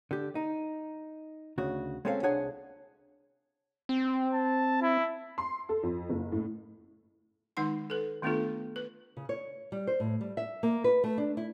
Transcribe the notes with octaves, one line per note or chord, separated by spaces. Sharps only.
D3 G4
D#4
D2 C#3 F#4
G#3 C4 C#4 A4 F5
C2 D4 G#4 C#5 F#5 G#5
C4
A5
E4
C6
A4
F2
F#1
A2
D#3 G#3 D#4 F#5 C6
A4 B4
D#3 A3 B3 D4 F4 A4
B4
C#3
C#5
G3
C5
A2
G3
E5
A#3
B4
A3
D4
E4